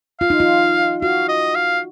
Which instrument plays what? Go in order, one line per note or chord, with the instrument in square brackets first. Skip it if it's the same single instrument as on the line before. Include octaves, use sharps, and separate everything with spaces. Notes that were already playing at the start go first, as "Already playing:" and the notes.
[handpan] F4 [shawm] F5
[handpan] D#4
F4
[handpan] F#4 [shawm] F5
[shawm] D#5
F5